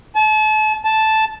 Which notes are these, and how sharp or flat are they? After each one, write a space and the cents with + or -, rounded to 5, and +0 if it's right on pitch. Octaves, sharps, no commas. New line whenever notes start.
A5 -35
A5 -5